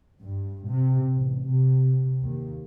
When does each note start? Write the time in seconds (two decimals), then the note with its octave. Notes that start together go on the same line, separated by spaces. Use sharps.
0.21 G2
0.69 C3
1.15 A1
1.48 C3
2.23 D#2